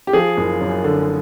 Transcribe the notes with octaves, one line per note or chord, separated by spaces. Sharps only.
G4
F3 G#4
F#1
F#2
D3